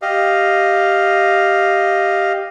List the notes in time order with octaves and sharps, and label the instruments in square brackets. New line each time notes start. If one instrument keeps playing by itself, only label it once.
[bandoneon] G4 D#5 F5